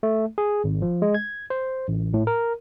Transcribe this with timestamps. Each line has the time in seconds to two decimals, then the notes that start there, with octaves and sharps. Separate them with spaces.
0.03 A3
0.38 G#4
0.64 G#1
0.82 F3
1.02 G#3
1.15 G#6
1.50 C5
1.88 A1
2.14 A2
2.27 A#4